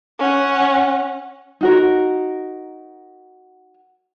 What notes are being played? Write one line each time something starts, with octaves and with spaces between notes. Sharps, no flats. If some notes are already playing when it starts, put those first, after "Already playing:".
C#4 F#5
D#4 F#4 A#4